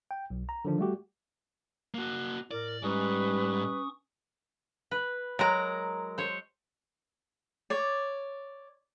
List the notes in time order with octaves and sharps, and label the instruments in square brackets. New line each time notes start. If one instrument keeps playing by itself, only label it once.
[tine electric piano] G5
B1
A#5
D3 D#3 F3 D4
G3 A3 F#4 G4
[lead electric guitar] A#3 F#4
[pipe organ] A2 [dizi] A#4 [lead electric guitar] D5
[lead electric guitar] G#2 [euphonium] G3 [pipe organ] C#4 C#6 D#6 [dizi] B4
[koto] B4
[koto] F#3 G#3 [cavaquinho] A#4 A#5
[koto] C5 C#5
[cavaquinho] C#5 D5